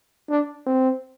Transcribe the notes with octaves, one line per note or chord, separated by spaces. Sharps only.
D4
C4